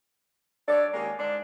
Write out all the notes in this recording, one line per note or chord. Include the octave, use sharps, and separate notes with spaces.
G3 D4 A4 C#5 D5
D#3 G#3 A#3 C#4 G4 A#4
G#2 D4 D5